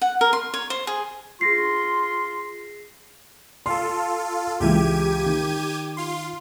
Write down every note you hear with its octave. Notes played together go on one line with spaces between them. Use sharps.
F#5
A#4
C6
C#5
C5
G#4
F4 G#4 C6 A#6 C7
F4 A4 C6
C#2 E3 G4 G#6 D#7
D#3
F4 C6